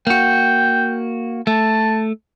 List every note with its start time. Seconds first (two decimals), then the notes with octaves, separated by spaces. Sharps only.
0.07 A#3 F#4 G5
1.47 A3 A5